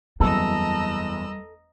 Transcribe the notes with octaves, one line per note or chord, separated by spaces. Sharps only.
F#1 E2 G3 A4 D#5 A#5 E6